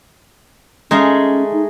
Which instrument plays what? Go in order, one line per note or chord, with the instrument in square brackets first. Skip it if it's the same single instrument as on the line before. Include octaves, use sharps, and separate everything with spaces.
[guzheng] G#3 A3 G#4 [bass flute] C#4 [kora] D#4 F5
[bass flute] D#4